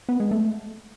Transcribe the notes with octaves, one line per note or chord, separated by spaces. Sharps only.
B3
G#3
A3